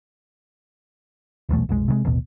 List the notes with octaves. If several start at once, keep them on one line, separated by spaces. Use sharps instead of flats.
D#1 B1 E2 A3
F1 B1 G#3
C3 E3 G#3
A1 D#2 B2